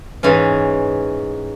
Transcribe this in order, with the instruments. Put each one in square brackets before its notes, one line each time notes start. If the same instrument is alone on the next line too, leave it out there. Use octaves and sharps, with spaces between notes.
[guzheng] G#2 E3 C#4